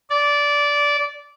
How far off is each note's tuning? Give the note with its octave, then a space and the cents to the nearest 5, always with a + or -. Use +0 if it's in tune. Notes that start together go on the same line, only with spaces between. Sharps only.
D5 -15